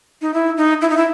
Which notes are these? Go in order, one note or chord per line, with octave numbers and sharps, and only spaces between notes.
D#4
E4
D#4
E4
D#4
E4